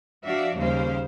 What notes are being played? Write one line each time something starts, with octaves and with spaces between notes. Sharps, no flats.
F3 D4 F#4 D5 E5 F5
D#2 C#3 G3 A#3 C5 F5